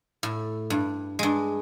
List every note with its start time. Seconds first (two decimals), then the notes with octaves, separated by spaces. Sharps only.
0.23 A2
0.70 G2
1.19 G2 G#3